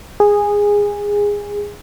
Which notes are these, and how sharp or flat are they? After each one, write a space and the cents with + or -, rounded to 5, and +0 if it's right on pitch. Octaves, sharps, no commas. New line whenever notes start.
G#4 -15